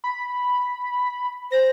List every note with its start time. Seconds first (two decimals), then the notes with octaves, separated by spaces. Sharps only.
0.04 B5
1.52 C5 A#6